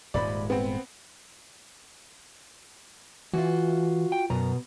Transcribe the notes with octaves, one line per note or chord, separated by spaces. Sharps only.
D#1 G#2 G#3 D5 B5
B3 C4
E3 F4 F#4
G5
F#2 B2 A#5